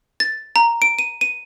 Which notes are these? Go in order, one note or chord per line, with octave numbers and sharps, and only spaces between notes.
A6
A#5
D7
D#7
D#7